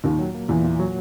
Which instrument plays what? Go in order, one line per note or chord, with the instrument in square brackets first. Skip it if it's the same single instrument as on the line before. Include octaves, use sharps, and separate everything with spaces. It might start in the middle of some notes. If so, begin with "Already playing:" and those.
[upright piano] D#2 D#3 [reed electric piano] A#2
[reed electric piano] F#3
A#3
[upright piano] E2 E3 [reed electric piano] A#2
[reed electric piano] A#2
F#3